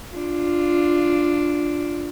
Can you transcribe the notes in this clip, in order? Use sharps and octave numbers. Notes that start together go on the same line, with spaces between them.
D4 F4